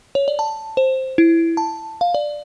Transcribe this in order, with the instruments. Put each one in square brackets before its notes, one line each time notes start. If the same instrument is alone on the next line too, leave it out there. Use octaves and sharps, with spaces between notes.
[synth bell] C#5
D5
A5
C5
E4
A5
F5
D5